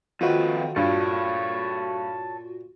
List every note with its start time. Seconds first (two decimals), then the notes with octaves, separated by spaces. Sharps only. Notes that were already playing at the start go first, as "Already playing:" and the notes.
0.21 F2 D#3 A3 C4 F4 F#4 B4
0.76 G2 A#2 A4 C#5